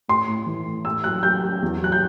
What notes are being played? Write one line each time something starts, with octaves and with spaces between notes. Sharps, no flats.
A2 C6
A2
E3
A2
A2 E6
F#3 F#6
F#3 G6
F#3
E2
F#3 F#6
G6